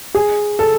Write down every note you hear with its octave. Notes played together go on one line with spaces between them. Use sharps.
G#4
A4